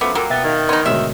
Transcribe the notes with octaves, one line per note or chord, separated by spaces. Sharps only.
F#2 F3 A3 B3 D6
F#3 G3 A#3 F4 A4
B2 B3 E5 G5 A6
D#3 D5 F5
B3 D#4 D5 C6
D2 G#2 B2 D#4 F#4 C#5 E5